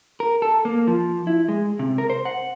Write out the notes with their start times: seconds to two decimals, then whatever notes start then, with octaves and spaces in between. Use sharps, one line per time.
0.20 A#4
0.42 A4
0.65 A#3
0.87 F3
1.27 E4
1.49 G#3
1.79 C3
1.98 A#4
2.10 C5
2.25 F#5